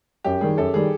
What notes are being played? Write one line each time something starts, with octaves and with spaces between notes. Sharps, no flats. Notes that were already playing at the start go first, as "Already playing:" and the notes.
F#2 G4
D#3 G3 G#4
F#2 A4
D#3 G3 G#4